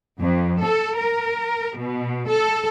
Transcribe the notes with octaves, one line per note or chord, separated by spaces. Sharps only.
F2
A4
A#4
B2
A4